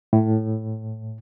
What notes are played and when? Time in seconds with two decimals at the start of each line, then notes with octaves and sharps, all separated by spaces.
0.13 A2